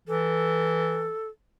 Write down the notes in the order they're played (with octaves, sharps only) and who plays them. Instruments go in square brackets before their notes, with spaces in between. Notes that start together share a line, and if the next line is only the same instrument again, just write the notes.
[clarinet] E3 [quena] A4